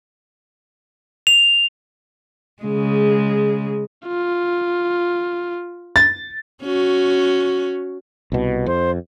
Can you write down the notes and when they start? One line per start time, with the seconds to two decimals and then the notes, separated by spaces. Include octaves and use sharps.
1.27 F7
2.63 C#3 G#3
4.07 F4
5.96 A6
6.63 C#4 F#4
8.32 C2 B2
8.66 F2 C5